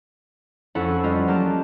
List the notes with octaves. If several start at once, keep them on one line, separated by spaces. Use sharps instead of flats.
F2 C#4 E4 A4 F#5 B5
G3 F4 D#5
F#3 A#3 G4 A#4 A5 A#6